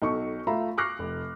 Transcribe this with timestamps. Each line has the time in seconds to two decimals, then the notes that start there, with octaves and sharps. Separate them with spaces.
0.02 B1 D#4 A4 C#6
0.47 A3 F4 E5 A#5 B5
0.77 C#6 D6 F6 F#6 A#6 C7
0.99 F1